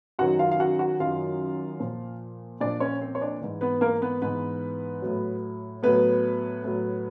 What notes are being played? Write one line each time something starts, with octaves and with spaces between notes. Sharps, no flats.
F#2 D#3 F#3 F#4 F#5
F4 F5
F5
F#4 F#5
F#4 F#5
F#2 D#3 F#3 F4 F5
A#2 F3
A#2 F3 D4 D5
C#4 C#5
C4 C5
C#5
D4 D5
G#2 E3
B3 B4
A#3 A#4
B3 B4
G#2 E3 B3 B4
A2 F#3
A2 F#3 B3 B4
A2 F#3